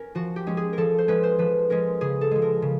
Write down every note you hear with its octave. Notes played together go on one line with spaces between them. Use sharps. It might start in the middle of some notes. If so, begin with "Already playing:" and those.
Already playing: C#4 A#4
F3 F#4
G4
G#3 C#4
G#4
F3 A4 A#4
C5
G#3 C#4 B4
C5
F3 B4
G#3 C#4 A#4
C#3 G#4
A4
F3 G#3
A#4
C#3